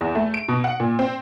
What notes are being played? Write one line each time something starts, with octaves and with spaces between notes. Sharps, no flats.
E2
A3
D7
B2
F#5
A#2
C4